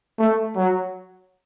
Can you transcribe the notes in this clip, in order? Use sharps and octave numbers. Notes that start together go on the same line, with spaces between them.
A3
F#3